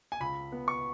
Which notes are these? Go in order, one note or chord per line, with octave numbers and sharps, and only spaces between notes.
G#5
C#2 B5
B3
C#6